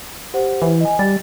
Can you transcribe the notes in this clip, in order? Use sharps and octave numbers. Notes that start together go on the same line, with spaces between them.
G4 C5 F#5
E3
D#5 G#5
G3 A6